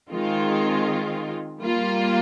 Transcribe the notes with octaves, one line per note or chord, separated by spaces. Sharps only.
D#3 G#3 C4 F4
G3 A#3 F4